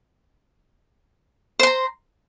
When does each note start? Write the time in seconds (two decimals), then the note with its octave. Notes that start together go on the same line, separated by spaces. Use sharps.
1.60 C5
1.63 C6
1.67 A#5